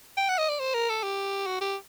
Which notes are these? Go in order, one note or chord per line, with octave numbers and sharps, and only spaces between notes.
G5
F#5
D#5
D5
C5
A#4
A4
G4
F#4
G4